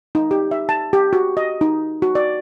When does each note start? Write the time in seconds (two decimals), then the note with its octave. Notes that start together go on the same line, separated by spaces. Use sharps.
0.15 D#4
0.31 G4
0.51 E5
0.69 A5
0.93 G4
1.13 F#4
1.37 D#5
1.61 D#4
2.02 F#4
2.15 D5